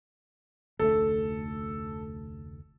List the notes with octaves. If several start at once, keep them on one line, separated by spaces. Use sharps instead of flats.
F1 D2 A3 A4